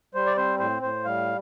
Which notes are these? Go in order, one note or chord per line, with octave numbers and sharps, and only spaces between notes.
G3 C5
D5
C4 C5
A2 C5
A2 C5
G3 F5